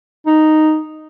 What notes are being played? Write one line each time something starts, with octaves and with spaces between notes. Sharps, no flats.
D#4